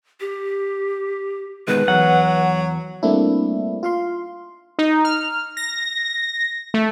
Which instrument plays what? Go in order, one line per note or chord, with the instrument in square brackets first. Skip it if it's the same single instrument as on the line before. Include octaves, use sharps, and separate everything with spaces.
[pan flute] G4
[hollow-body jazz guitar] B2 D#3 G#3 [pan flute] B4
[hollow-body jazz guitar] E2 [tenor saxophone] F#3 [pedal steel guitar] F#5
[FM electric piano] G3 A3 A#3 C4 D4 E4
F4 F5 C6
[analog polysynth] D#4
F6
A#6
A3